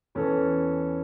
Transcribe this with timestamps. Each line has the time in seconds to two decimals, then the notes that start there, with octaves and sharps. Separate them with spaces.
0.15 E2 E3 C#4 A4